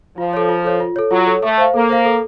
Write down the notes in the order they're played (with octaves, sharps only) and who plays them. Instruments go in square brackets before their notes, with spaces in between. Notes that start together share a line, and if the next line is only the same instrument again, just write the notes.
[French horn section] F3 [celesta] F4
[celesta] A4 C#5
F4
A4 C#5
F4
A4 C#5
[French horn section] F#3 [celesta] F4
[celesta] A4 C#5
[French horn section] A3 [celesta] A4
[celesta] C5 F5
[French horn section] A#3 [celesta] A4
[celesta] C5 F5
A4